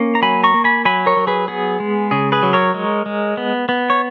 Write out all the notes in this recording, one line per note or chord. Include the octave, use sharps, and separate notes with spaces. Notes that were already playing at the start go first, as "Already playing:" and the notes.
Already playing: A#3 C#4
A#5
F#3 G#5 B5
A#5 C#6
A#3
G#5 B5
F#3 G#5 B5
A#4 C#5
F#3
G#4 B4
B3 G#4
G#3
C#3 G#4
G#4 B4
F#3
A#4 C#5
G#3
G#3
B3
B3
C#5